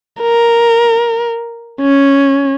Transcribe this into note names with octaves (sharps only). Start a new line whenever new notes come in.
A#4
C#4